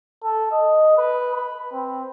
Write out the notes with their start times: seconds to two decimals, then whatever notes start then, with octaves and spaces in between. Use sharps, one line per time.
0.23 A4
0.51 D#5
0.98 B4
1.35 B5
1.73 C4